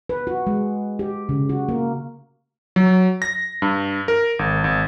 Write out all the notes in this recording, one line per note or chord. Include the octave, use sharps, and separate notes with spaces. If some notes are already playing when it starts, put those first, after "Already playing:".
B4
F#4
G#3
G4
C#3
F#4
A#3
F#3
A#6
G2
A#4
G#1
G#1